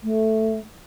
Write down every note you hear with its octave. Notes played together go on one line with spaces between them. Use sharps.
A3